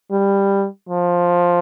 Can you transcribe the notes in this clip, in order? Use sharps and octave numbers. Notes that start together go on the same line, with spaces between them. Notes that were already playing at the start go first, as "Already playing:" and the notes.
G3
F3